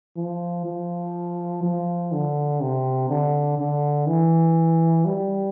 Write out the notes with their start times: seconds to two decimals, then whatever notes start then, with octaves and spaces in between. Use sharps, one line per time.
0.17 F3
0.66 F3
1.63 F3
2.12 D3
2.61 C3
3.10 D3
3.59 D3
4.07 E3
5.05 G3